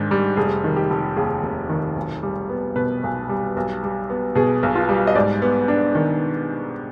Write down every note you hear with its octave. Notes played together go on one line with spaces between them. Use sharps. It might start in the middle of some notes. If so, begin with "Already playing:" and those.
Already playing: G#2 D#3 D4
G3
F1 G#4
D#3
G4
F1
D#2 G#4
F1
D#3
B1
G3
B3
B2 B4
B1
G3
B1
G3
B3
B2 G#4
B1
F4
G3
D#5
G#2 D5
B3
D4
D#3